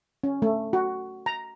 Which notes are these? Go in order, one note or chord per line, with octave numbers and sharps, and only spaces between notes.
C#4
A3
F#4
A#5